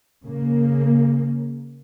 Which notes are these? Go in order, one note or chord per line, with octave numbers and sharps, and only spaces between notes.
C#3 A#3